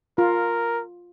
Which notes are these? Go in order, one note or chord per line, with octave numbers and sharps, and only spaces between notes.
F4 A#4